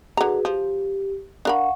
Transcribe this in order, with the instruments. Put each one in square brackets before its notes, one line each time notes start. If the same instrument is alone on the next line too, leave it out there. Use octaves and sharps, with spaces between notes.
[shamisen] D3 A#5 [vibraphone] F#4 G#4 B4
[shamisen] F3 [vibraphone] G4
[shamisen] D4 A#4 B5 [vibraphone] F5 F#5 C#6